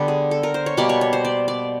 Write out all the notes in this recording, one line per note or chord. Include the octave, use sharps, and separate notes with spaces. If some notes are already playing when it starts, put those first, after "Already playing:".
Already playing: D3 G3 B3
G#4
A4
A#4
C5
C#5
B2 G3 A#3 D5
C#5
C#5
C5
D5
D5